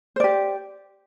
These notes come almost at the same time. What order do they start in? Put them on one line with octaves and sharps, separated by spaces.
C5 D5 G4